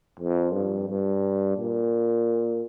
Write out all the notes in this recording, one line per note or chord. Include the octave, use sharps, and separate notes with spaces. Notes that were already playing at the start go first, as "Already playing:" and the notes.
F2
G2
G2
A#2